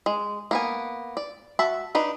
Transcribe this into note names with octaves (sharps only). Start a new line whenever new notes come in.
G#3
A#3 B3 G#5
D5
F#4 E5 A5
D4 D#4 B4